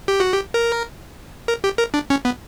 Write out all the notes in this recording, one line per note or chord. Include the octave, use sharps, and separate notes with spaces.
G4
F#4
G4
A#4
A#4
G4
A#4
D4
C#4
B3